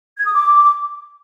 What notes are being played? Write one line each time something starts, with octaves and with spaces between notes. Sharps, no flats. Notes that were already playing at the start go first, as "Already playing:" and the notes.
G#6
D#6
D6